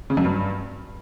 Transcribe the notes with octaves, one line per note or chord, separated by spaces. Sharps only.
C#3
F#2
G2